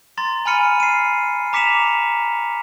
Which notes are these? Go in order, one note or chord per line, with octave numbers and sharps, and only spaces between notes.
A#5 C6 A6
G#5 B5 F6 C#7 D#7
C7 D#7
A#5 D6 B6 C#7 E7 F7